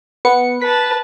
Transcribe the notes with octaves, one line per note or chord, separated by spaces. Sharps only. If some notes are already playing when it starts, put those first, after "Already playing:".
B3 B4 C#7
B4 A5 B6